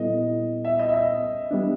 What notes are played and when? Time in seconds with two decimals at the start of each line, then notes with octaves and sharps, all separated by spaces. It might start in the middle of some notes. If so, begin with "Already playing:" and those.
Already playing: A#2 G3 B3 E4 A4 D#5
0.65 E5
0.79 D#5
0.89 E5
0.94 D#5
1.51 G3 B3 D4